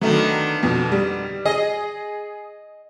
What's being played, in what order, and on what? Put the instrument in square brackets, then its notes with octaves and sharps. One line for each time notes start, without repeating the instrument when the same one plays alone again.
[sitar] D3 D#3 B3 [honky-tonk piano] F#3 A3
[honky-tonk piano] F2 B2
G3
[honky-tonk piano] G#4 [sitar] D#5